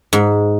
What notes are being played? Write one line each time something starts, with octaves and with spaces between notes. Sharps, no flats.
G#2